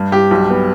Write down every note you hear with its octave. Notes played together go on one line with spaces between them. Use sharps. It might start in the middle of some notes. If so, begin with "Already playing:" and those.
Already playing: G2
G2 G4
B1
B3